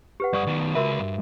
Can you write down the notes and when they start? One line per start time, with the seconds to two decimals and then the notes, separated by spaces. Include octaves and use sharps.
0.20 G4 B4 F#5
0.33 G2 D5 F#5 C#6 D#6
0.47 D#3 B3
0.60 A5
0.75 C#2 F#4 A#4 B4 E5
1.00 G2